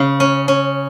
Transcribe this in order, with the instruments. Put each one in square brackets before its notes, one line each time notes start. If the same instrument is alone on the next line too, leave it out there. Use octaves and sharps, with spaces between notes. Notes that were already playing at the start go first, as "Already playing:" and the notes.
Already playing: [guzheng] C#3
C#4
C#4